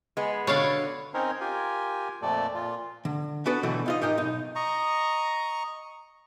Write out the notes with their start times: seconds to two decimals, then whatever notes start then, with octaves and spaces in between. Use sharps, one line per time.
0.17 G#3 B3
0.47 B2 D3 C#5 D5 F5
1.14 C4 C#4 D#4 A#4 C5 C#5
1.40 F4 G4 A#4 G#5
2.22 F2 A#2 A3 A4 D5
2.55 A#2 F4
3.05 D3
3.46 B3 D4 F#4 A4 B4
3.63 B2 D3 E3 F#3 G3 A3
3.86 D#4 F4 D#5
4.02 G#2 D#4 G4 A#4 D#5
4.17 B1 D#4
4.55 D#5 A#5 C#6